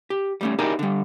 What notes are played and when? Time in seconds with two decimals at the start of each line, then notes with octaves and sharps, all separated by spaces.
0.10 G4
0.41 G3 A3 C#4
0.59 D#4 E4 G4 G#4 A#4 D5
0.79 D3 G3